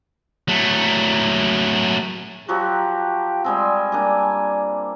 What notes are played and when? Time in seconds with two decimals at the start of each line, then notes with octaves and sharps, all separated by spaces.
0.48 F#3 A3
2.48 F3 F#3 F#4 G4
3.44 G3 G#3 C4 G#5
3.92 G3 A#3 D4